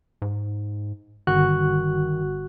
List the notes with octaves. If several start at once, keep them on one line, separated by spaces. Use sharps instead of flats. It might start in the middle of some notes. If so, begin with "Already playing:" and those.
G#2
G1 D#3 F#4 F#6